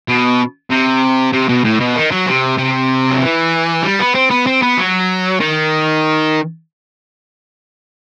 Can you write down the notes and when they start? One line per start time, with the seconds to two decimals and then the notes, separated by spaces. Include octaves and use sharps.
0.08 B2
0.70 C3
1.33 C3
1.49 B2
1.64 A2
1.80 B2
1.96 D#3
2.11 F#3
2.27 C3
2.58 C3
3.11 F#3
3.20 E3
3.83 G3
3.99 B3
4.15 C4
4.30 B3
4.46 C4
4.62 B3
4.77 F#3
5.40 D#3